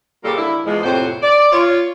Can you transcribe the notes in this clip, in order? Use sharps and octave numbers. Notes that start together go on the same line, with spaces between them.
A#2 C#3 G3 A#3 F4 A4
D3 E4
E2 F3 G#3
F2 A2 C3 C5 C#5 F#5
D5
F4 C#5